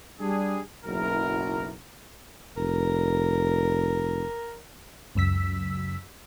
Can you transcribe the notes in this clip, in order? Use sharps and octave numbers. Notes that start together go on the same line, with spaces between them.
G3 D4 G#4
F#1 B1 E4 A#4
F1 A#4
C#2 F#2 E6 B6